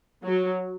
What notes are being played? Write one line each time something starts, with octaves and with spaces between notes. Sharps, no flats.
F#3